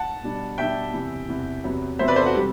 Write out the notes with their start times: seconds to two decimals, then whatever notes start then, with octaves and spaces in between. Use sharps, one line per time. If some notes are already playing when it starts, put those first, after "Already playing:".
Already playing: F#5 A5
0.23 B2 G3 D4
0.58 B2 G3 D4 E5 G5
0.93 E2 C3 E3
1.28 E2 C3 E3
1.64 E2 C3 F#3 B3
1.99 E2 C3 F#3 B3 C5 E5
2.08 B4 D5
2.16 A4 C5
2.26 F#4
2.34 C3 G3 G4